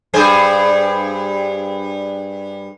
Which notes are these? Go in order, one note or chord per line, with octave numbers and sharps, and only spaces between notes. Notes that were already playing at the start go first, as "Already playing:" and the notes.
G2 G#4 C5